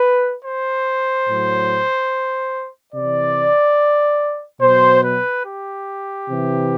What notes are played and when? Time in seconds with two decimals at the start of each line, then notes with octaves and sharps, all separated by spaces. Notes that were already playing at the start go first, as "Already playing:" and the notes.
Already playing: B4
0.43 C5
1.26 A2 F#3
2.94 C3 E3 D5
4.61 B2 F#3 C5
5.02 B4
5.45 G4
6.28 C3 E3